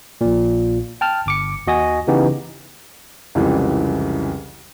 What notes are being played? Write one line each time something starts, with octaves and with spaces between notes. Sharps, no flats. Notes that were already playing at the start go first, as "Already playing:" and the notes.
A#1 A#2
G5 A5 F6
G1 D6 C#7
D#2 F#4 D#5 G#5 A#6
C#3 E3 B3 D#4 G4
C2 F2 C#3 E3 G3 G#3